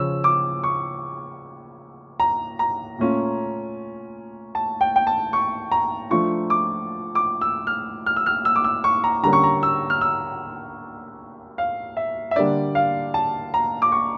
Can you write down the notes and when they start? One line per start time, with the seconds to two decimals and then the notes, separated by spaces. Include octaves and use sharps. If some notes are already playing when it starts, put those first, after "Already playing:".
Already playing: C#3 F3 C#4 E6
0.24 D6
0.64 C#6
2.20 A#5
2.59 A#5
2.98 A#2 A3 C#4 F4
4.55 A5
4.81 G5
4.96 G5
5.07 A5
5.33 C#6
5.72 A#5
6.10 F3 A3 D4 F4 C#6
6.50 D6
7.15 D6
7.41 E6
7.67 F6
8.06 F6
8.17 E6
8.26 F6
8.45 E6
8.56 D6
8.64 E6
8.84 C#6
9.04 A#5
9.23 D3 G3 A#3 C#4 A#5
9.33 C#6
9.44 A#5
9.63 E6
9.90 F6
10.01 E6
11.58 F5
11.97 E5
12.31 E5
12.36 D3 G3 A#3 D4 D5
12.75 F5
13.14 A5
13.54 A#5
13.82 D6
13.92 C#6